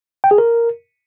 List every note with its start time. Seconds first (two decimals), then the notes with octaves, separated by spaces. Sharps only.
0.24 G5
0.31 G#4
0.38 A#4